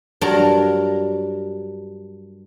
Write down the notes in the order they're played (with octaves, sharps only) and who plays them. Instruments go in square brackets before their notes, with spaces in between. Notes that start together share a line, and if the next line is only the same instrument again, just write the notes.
[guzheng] G2 F#3 D4 A#4 A5